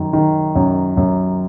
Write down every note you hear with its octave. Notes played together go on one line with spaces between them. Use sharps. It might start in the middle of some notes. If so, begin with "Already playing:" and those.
Already playing: F#2 D#3
D#3
F#2
F#2